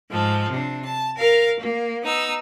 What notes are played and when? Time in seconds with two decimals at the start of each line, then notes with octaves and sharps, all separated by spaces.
0.10 G#2 F3 A4
0.51 C3 D4
0.86 A5
1.17 A#4 F5
1.60 A#3
2.04 B3 D#4 E6